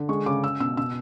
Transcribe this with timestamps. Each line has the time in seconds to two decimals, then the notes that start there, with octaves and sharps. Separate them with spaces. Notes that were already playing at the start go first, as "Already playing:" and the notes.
Already playing: D3
0.09 G#3 C#6
0.26 C#3 D6
0.44 C#4 E6
0.60 B2 E6
0.77 B2 E6